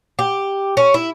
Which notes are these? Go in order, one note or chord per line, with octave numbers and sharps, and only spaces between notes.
G4
C#4
E4